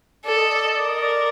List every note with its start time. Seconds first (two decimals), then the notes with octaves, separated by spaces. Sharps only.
0.25 A4 D5
0.38 D#5
0.51 D5
0.63 D#5
0.76 A#4 D5
0.89 D#5
1.02 D5